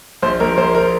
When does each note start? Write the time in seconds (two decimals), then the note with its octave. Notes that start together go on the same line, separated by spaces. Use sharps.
0.22 A#1 C5
0.40 A#1 A#4
0.57 A#1 C5
0.75 A#4